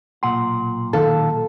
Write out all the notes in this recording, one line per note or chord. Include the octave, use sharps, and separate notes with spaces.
B1 A#2 F#5 C6
D#3 A4 F5 A5